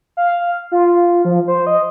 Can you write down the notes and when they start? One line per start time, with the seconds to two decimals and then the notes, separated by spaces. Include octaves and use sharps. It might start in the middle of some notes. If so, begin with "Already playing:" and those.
0.17 F5
0.72 F4
1.25 F3
1.48 C5
1.67 D#5